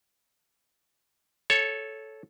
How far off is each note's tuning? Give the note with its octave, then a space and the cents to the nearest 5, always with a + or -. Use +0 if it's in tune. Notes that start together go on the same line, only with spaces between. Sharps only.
A4 -10 C#5 +0